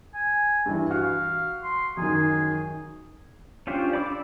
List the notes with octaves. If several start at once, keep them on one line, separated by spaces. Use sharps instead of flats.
G#5
G2 E3
F#4 F5
C6
F#2 D#3 G#4
C#4 D4 F4 G4 C5
D5 B5 D6 E6